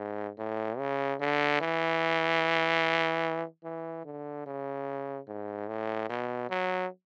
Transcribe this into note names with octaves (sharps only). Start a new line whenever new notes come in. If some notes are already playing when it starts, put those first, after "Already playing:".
Already playing: G#2
A2
C#3
D3
E3
E3
D3
C#3
G#2
A2
B2
F#3